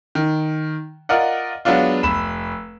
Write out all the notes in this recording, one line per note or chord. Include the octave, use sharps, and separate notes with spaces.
D#3
F4 A#4 D5 D#5 F#5
F#3 G#3 B3 D4 F4
F1 B5 E7